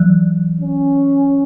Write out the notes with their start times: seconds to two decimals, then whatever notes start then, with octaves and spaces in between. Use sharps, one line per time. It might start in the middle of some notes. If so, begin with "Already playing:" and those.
Already playing: E3 F#3
0.61 C#4